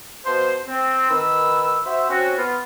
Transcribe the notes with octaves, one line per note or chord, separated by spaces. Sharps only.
B2 F3 C5
C4
D#3 B4 E6
F#4 C5 E5
C4 C#4 F#4
B3 F4